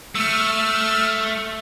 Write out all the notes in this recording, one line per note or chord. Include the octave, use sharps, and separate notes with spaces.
A3 E6 F6